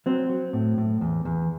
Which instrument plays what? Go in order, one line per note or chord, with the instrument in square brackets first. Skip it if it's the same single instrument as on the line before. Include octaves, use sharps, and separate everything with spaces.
[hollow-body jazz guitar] F#3 C4
F#3
A2
A2
E2
E2